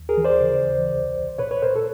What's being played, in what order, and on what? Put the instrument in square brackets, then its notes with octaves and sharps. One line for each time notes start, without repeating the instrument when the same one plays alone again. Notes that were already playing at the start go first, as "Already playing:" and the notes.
Already playing: [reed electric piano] D#2
G#4 A#4
E3
C5 D5
C#3
D#2
C2
C2
A#2 B4 C#5
B4 C#5
A#2 A#4 C5
A4 B4